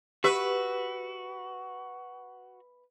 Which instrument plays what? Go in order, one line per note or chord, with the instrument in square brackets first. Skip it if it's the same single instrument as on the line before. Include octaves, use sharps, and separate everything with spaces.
[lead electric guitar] F#4 [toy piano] G4 [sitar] B4 E5